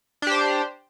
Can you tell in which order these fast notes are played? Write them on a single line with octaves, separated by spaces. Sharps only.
D4 G4 C5